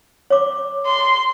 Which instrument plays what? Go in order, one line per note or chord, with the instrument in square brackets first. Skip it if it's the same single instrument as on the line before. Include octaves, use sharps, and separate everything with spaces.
[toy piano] C#5 D6
[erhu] C6